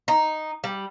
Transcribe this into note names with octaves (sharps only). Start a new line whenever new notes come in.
D#4
G3